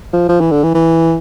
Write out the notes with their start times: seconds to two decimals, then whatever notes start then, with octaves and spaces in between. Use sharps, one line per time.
0.13 F3
0.29 F3
0.41 E3
0.51 D3
0.63 E3
0.75 E3